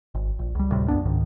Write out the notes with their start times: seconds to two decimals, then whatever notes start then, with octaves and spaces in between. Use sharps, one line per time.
0.15 G#1
0.39 A#1
0.55 C#2 G3
0.72 D2 A2 C3 G3
0.88 C2 F#2 B3 D4
1.05 C#2 G#2 D#3